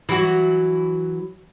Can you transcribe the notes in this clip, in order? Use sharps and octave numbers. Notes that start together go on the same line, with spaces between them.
E3 F#3 F#4